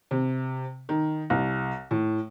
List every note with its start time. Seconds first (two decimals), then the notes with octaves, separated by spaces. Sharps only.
0.11 C3
0.89 D#3
1.30 C2
1.91 A2